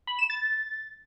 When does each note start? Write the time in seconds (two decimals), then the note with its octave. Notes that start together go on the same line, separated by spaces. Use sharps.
0.07 B5
0.19 E7
0.30 A6